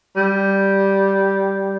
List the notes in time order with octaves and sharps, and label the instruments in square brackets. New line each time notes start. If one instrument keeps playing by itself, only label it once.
[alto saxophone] G3